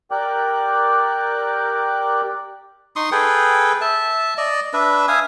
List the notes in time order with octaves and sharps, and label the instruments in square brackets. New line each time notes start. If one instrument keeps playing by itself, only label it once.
[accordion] G4 A#4 D5 G5 D6 F#6
[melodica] D#4 C6 C#6 D#6
G#4 A4 B4 G5
E5 A5
D5 D#5
D4 B4 E5
E5 F5 G#5 D#6